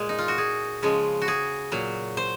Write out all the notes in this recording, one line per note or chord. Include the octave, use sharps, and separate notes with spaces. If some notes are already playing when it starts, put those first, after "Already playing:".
Already playing: A#2 G#3
D#4
F4
F#4
G#4
C#3 F3 G#3
F#4
G#4
A#2 F#3
C5